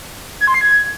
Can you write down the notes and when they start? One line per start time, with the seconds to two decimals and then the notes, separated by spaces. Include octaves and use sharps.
0.41 G#6
0.47 C6
0.54 C7
0.61 G#6